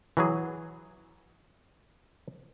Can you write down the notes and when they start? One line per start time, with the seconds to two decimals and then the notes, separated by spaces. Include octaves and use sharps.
0.17 E3 F#3 G#4